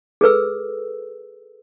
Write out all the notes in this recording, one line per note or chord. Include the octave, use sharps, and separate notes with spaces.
G#4 A4 B4 E6